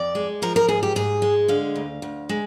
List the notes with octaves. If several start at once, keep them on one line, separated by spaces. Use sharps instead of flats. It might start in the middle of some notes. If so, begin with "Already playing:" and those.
Already playing: F2 D5
G#3
F3 A#4
A#4
G#2 G#4
G4
G#2 G#4
G#3
D3 F5
D2
D2
G#3